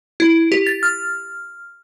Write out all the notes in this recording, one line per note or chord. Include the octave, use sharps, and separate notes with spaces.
E4
G4
A6
F6